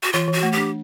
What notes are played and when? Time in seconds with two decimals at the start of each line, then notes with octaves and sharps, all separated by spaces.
0.03 F#4
0.13 E3 F4
0.28 E3
0.33 F#4
0.43 A3
0.53 D4 G4